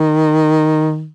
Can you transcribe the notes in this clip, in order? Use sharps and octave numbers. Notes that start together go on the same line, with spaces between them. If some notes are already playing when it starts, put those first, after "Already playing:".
Already playing: D#3